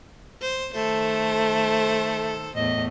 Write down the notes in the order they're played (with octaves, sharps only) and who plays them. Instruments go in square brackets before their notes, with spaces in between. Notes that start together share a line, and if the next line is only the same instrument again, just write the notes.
[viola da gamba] C5
[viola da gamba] D#3 A4 C5 [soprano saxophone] A3
[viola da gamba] E2 A2 [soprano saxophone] D#5